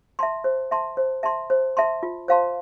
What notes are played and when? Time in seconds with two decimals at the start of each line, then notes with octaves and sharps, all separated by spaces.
0.19 E5 A5 C6
0.44 C5
0.71 E5 A5 C6
0.97 C5
1.23 E5 A5 C6
1.50 C5
1.77 E5 A5 C6
2.03 F4
2.28 C5 F5 A5 C6